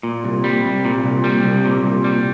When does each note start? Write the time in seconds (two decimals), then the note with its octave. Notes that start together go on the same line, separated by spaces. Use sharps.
0.03 A#2
0.24 C2
0.44 G3
0.65 C2
0.85 A#2
1.04 C2
1.24 G3
1.44 C2
1.65 A#2
1.84 C2
2.04 G3